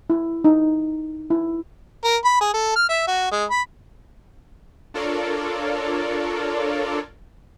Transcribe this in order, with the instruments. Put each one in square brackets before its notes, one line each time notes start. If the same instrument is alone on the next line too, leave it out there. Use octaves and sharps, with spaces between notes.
[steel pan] E4
D#4
E4
[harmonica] A#4
B5
G#4
A4
F6
E5
F#4
G#3
B5
[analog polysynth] D4 F4 A4 A#4 C#5 D5